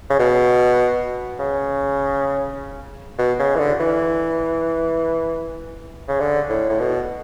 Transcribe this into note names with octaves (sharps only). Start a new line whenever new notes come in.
C#3
B2
C#3
B2
C#3
E3
D3
E3
C#3
D3
A2
A2
B2